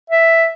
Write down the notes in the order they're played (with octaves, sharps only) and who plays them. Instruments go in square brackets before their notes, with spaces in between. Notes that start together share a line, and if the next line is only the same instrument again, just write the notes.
[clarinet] E5